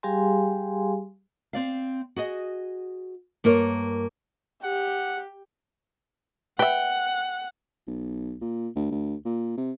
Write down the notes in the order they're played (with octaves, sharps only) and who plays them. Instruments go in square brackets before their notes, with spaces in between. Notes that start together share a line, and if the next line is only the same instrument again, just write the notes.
[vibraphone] G3 G4 G#4 F5 G#5 C6
[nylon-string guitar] C4 D5 F5
F#4 G#4 D#5
G2 A#3 F4 A#4 C#5
[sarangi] G4 [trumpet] F#5
[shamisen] B4 E5 [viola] F#5 [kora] G5
[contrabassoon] B1
A#2
D2
D2
A#2
C3